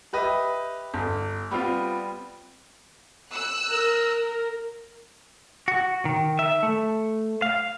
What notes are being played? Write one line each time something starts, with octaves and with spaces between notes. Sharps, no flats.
G4 B4 D#5 E5
G1
G3 B3 C4 F4
E6 F#6
A#4
F#4
D#3
E5
A3
F5